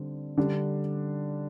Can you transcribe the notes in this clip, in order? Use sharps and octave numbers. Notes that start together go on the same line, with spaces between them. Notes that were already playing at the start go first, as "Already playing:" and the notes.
Already playing: D3 G3 C4
D3 G3 D4